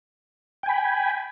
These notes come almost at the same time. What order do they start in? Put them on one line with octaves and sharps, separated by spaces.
G5 G#5 B5